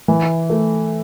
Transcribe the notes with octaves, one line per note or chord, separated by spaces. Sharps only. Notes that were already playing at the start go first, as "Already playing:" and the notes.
E3
A3